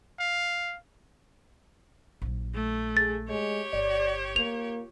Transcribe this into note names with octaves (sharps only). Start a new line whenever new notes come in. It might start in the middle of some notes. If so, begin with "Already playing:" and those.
F5
A#1 F#3
A3
G#4 A6
G#3 G4 C#5
G1 D5
A#3 F4 F7